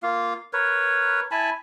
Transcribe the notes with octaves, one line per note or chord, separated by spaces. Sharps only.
A#3 F4 F5
A#4 B4 C#5
E4 G#5 A5 B5